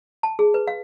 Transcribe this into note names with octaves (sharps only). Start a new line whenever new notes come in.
A5
G#4
B4
F5